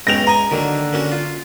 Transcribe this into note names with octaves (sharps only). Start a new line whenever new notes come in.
B1 G#3 C#4 G5 A#6 F7
D#5 G#5 A#5
D3 D#3 F#3 A#3
A#3 C#4 F#4
F4